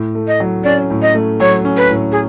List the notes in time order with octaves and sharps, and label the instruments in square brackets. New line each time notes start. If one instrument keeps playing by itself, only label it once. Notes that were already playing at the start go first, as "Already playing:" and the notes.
Already playing: [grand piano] A2
A3
[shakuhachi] D#5
[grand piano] F#3
[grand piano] C#4 [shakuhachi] D5
[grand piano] A2
[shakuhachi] D#5
[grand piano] A3
[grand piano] F#3 [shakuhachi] C#5
[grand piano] C#4
[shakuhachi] B4
[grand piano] A2
[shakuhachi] G#4